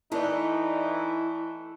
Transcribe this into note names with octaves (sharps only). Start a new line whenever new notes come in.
E3 A3 D#4 E4 D5